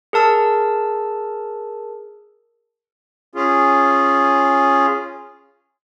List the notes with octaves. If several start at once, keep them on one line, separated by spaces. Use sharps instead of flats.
G#4 A#4 A5 E6
C#4 F4 G#4